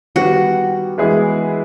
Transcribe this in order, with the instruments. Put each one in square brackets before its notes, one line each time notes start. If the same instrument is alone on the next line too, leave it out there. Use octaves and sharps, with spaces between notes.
[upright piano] D#3 G3 B3 [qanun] F#4
[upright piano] E3 G#3 B3 E4 G#4